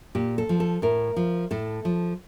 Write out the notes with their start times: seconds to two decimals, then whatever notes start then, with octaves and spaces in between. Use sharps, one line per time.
0.15 A#2 G4
0.38 A4
0.49 F3
0.60 A4
0.82 A2 A#4
1.16 F3
1.51 A2 A4
1.85 F3